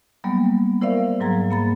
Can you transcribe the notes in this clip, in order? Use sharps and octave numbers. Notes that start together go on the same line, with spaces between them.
F#3 G3 A#3 B3
E4 A#4 C5 D5 E5 F5
G#2 F#3 A#5 G#6
A#3 B5 A6